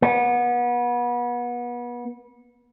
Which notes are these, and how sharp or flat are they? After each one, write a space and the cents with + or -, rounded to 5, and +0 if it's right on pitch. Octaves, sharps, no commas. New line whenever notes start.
B3 -30